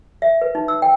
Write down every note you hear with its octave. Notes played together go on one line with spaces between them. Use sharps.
E5
B4
D#4
E6
G5